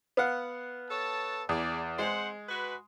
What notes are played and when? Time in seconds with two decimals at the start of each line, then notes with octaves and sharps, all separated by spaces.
0.17 B3 F5 F#5
0.91 A4 C#5 A5
1.49 E2 G#4 D5
1.99 G#3 C4 C5 F#5
2.49 F#4 B4